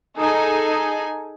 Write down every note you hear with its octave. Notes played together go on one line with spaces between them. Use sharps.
D#4 G#4 A4 G#5